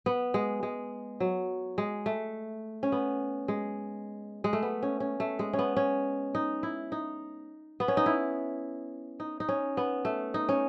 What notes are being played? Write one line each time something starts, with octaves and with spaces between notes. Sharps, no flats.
B3
G#3
G#3
F#3
G#3
A3
C#4
B3
G#3
G#3
A3
B3
C#4
C#4
A3
G#3
C#4
B3
C#4
D#4
E4
D#4
B3
C#4
D#4
E4
D#4
D#4
C#4
B3
A3
D#4
C#4